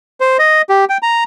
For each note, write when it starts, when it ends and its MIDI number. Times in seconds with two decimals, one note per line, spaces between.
0.20 0.37 72
0.39 0.62 75
0.69 0.85 67
0.89 0.98 79
1.03 1.24 82